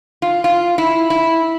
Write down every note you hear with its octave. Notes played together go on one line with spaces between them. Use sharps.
F4
F4
E4
E4